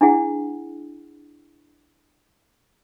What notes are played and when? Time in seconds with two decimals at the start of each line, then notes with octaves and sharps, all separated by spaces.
0.01 D4 E4 G#4 F#5